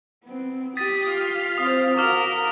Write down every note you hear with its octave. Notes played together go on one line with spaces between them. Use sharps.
B3 C4
G4 D#6 A6 B6
F4
C4 C5 F5 D#6
F#4 A#4 D6 F6 F7